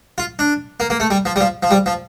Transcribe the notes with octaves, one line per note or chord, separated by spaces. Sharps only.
F4
D4
A#3
A#3
A3
G3
F3
G3
F3
F3
G3
F3